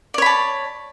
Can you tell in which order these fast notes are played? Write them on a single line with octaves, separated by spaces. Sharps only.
D5 C#5 B5 A5